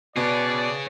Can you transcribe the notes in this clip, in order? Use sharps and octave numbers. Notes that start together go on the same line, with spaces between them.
B2 G#4 B4 C#5 D5